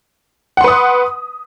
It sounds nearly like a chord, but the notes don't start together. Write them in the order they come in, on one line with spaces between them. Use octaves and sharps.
F#5 C6 B4 D#6